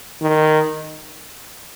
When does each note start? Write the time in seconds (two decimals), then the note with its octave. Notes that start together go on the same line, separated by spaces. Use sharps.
0.22 D#3